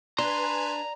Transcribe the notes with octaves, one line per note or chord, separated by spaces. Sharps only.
D4 B4 G#5 A#5 C6